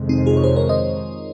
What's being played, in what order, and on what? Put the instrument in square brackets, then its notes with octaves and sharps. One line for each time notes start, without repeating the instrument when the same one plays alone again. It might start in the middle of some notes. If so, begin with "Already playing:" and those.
Already playing: [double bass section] F2 C3 D#3 G#3
[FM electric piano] C4 D#4
F4 G#4
C#5
G#4 C5
A#4 C#5
C5 D#5